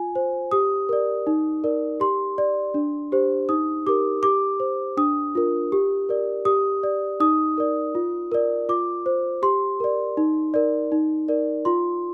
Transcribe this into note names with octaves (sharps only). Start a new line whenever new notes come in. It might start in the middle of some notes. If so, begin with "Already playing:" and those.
Already playing: F4 G#5
C5
G4 D#6
A#4 D5
D#4
A#4 D5
G4 C6
D5
D4
G4 C5
D#4 D#6
G4 A#4 D6
G4 D6
C5
D4 D#6
F4 A#4
G4
A#4 D5
G4 D#6
D5
D#4 D#6
A#4 D5
F4
A#4 D5
F4 D6
C5
G4 C6
A#4 D5
D#4
A#4 D5
D#4
A#4 D5
F4 C6